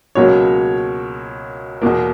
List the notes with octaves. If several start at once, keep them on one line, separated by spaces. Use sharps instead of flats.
C#2 B2 F#3 A#3 C#5
E2 B2 A#3